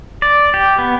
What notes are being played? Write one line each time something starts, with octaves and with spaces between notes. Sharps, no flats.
D5
G4
B3